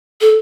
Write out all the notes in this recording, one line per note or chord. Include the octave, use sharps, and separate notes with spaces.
A4